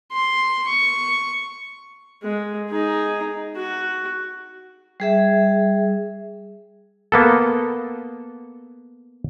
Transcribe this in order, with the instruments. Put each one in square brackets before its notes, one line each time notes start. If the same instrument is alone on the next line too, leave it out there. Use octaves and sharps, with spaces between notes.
[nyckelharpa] C6
C#6
G#3
D#4 G#4
F#4
[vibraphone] G3 G#4 E5
[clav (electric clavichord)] A#3 B3 A4